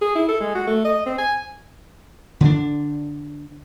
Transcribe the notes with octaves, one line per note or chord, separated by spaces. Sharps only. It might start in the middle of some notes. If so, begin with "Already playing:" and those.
G#4
E4
A4
G#3
F#4
A3
D#5
C4
G#5
D3 C#4 D4